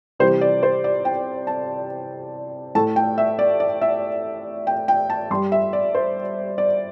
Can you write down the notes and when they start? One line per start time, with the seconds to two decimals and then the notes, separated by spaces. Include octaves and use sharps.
0.19 C3 E3 G3 C5
0.41 D5
0.63 C5
0.84 D5
1.05 G5
1.47 A5
2.75 A2 A3 A5
2.96 G5
3.18 E5
3.39 D5
3.60 D5
3.81 E5
4.67 G5
4.88 G5
5.10 A5
5.30 G2 C6
5.34 G3
5.52 E5
5.73 D5
5.95 C5
6.58 D5